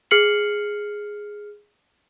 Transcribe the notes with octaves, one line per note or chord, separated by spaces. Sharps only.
G#4 F6 C7 C#7 F#7